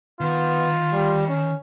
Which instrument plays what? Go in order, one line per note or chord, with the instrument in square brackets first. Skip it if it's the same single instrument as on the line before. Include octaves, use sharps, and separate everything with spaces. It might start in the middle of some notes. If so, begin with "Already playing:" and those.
[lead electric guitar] D#3 [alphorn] B3 [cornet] F4
[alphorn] G3
C#4